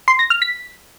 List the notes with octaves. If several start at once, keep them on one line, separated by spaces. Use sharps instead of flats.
C6
A#6
F6
B6